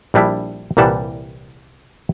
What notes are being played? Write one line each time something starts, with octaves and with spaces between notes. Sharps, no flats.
A#1 G3 D4 E4
C2 A#2 E3 G3 F#5 A5